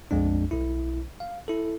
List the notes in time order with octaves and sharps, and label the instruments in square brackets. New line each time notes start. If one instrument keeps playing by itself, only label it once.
[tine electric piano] A#1 F2 G#3 D4
B1 E4
F5
E4 A4